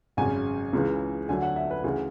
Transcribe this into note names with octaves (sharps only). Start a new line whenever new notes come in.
G#1 F#2 C#3 G#5
C#2 C#3 E3
D2 D3 F#3 G#5
F#5
E5
B4
D2 C#3 E3 G#4